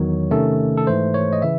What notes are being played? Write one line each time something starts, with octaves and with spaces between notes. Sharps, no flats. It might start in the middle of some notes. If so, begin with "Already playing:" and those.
Already playing: E2 D#3 F#3 C#5
C3 D#3 A3 C#4 A4
A4
G#2 E3 A3 C5
C#5
D#5
C#3 E3 E5